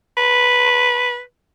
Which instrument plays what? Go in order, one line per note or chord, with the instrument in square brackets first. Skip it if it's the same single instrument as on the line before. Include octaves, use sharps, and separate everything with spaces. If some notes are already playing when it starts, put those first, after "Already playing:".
[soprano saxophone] B4